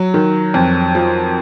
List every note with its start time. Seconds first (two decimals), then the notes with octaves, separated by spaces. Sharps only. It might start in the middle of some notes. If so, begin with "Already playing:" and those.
Already playing: F#3
0.14 D#3
0.54 F2
0.95 F3